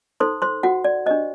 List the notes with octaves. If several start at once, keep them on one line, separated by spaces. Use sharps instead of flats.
D#4 A4 C5 C6
C5 C6
F#4 F#5
D5
D4 G4 C5 D#5